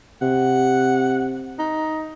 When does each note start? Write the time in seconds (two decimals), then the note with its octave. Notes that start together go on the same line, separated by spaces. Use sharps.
0.22 C3 F#5
1.59 D#4